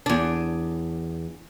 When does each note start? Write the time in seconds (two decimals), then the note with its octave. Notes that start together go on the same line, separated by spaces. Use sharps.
0.06 E2 D4